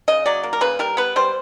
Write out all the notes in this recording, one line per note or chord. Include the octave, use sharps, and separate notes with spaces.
C#3 D#5
F#3 D5
A#3
A#4
C#3 B4
G3 A#4
B3 B4
G3 C5